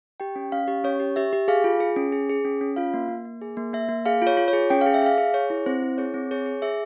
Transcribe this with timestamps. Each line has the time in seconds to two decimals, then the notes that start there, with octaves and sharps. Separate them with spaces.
0.20 G4 G5
0.36 C#4
0.52 C#4 F5
0.68 G4
0.84 C#4 C#5
1.00 G4
1.16 G4 E5
1.33 G4
1.48 G#4 F5
1.64 F4
1.80 G#4
1.96 C#4
2.12 G#4
2.29 G#4
2.45 C#4
2.61 C#4
2.76 F4 F5
2.94 A#3
3.09 A#3
3.25 A#3
3.41 G#4
3.57 A#3
3.73 A#3 E5
3.89 A#3
4.06 G#4 F5
4.22 F4
4.27 C#5
4.37 F4
4.48 C#5
4.53 G#4
4.70 C#4 G5
4.81 G#4 F5
4.94 E5
5.02 G#4 F5
5.18 G#4
5.34 G#4 C#5
5.50 E4
5.66 C4 C5
5.82 E4
5.98 G#4 C#5
6.14 C4
6.31 G#4 C#5
6.46 G#4
6.62 G#4 E5